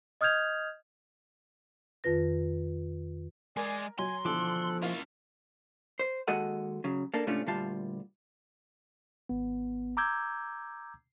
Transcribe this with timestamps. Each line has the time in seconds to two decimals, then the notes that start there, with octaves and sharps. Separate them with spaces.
0.21 D#5 D#6 F6 G6 G#6 F7
2.04 F2 D#3 F4 B4 A#6
3.57 G#3 A#4 D5 G#5
3.99 F#3 G#5 C6
4.25 B2 D3 E3 F3 A4 D6 F#6
4.82 A#3 C#4 E4 F4 F5
5.99 C5
6.28 D#2 G#3 F#4 A4 D#5 F#5
6.84 C#3 F#3
7.14 A#3 D4 A4
7.27 G#2 C3 A3 C#4 D4 F4
7.46 D2 A#2 G3 F4 A5
9.29 G#1 B3
9.97 A#5 D6 E6 G6 G#6